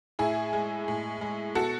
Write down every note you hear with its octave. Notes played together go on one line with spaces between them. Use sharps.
A2 E4 G#4
G#3
A2
G#3
B2 F#4 A4